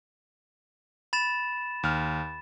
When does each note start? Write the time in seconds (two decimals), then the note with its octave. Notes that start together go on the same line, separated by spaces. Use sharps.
1.13 B5 A6 E7
1.83 D#2 F6